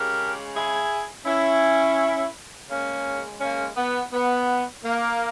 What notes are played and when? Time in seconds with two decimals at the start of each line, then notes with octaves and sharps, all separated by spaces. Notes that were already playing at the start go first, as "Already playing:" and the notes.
Already playing: C#3 G#3 G4 A#4
0.53 E4 G#4
1.25 C#4 E4
2.68 C#3 G#3 A#3 C#4
3.40 A#3 C#4
3.76 B3
4.12 B3
4.84 A#3